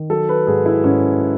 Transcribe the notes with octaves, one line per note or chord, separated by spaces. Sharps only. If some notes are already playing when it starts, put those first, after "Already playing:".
Already playing: D#3
F#3 A4
B4
G#2 G#4
E4
G#2 C#4